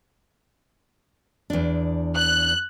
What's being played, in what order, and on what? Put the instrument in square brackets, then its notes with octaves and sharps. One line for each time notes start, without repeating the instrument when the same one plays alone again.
[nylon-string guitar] E2 D4
[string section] F#6